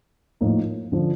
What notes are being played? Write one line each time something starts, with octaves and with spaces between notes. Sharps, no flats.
A2 F3 A#3 D#4
D3 F3